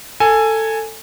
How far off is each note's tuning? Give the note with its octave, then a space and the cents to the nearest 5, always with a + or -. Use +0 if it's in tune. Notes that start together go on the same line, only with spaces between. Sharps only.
A4 +15 G#5 +0